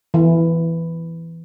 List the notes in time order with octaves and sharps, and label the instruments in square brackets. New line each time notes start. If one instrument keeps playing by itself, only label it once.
[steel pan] E3